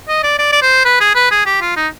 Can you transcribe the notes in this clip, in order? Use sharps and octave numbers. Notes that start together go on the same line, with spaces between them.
D#5
D5
D5
D5
C5
B4
G#4
B4
G#4
G4
F4
D#4